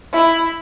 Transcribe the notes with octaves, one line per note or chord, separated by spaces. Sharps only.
E4